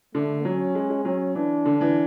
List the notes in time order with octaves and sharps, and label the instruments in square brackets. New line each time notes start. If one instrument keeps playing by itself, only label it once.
[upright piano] D3 [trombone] A3
[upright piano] F#3 [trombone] C#4
[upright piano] G#3
G#3
[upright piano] F#3 [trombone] C#4
[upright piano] E3 [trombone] D4
[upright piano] D3
E3